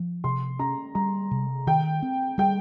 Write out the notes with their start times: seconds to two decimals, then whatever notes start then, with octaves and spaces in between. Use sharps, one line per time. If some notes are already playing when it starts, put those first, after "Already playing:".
Already playing: F3
0.24 C3 C6
0.59 C#4 A#5
0.95 G3 A#5
1.31 C3
1.67 D#3 G5
2.02 C4
2.38 G3 G5